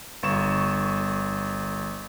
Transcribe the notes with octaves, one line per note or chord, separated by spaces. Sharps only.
G1 C#6 E7